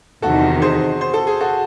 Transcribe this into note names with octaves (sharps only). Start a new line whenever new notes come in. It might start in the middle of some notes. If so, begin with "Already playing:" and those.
E2 C3 D#3 F#4 A4
G#4 C5
C5
A4
G#4
F#4 A4